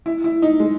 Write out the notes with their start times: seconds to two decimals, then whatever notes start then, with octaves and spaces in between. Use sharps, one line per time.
0.06 E4
0.24 E4
0.42 D#4
0.60 G#3